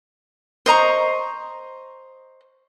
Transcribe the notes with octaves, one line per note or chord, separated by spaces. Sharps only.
C5 D#5 A#5 C#6